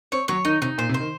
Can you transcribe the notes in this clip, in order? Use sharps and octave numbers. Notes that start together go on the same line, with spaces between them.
C4 C#5
F#3 C#5
D#3 D#4
C3 D#4
A#2 C5
C3
C5
D#3